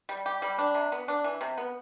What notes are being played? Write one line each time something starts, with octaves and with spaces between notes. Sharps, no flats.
G3
G4
G3
D4
C3
B3
D4
E3
C3
B3